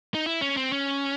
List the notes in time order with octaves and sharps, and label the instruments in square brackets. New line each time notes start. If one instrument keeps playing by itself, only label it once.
[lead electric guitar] D#4
E4
C#4
C4
C#4